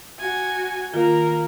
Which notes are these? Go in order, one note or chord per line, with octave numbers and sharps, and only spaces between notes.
F#4 G#5
D#3 A#3 F4 A#4